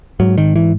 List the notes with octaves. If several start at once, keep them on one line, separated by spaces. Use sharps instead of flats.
G#2 F#3
D#3
E3